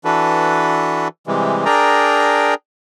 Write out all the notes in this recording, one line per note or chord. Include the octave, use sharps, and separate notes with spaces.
E3 D4 F#4 A4 B4
C3 E3 G3 G#3
D4 G#4 A#4 D5 G5 A#5